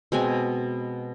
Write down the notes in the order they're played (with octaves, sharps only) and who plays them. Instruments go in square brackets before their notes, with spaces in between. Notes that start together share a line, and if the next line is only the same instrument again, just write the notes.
[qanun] B2 G#3 C4 G#5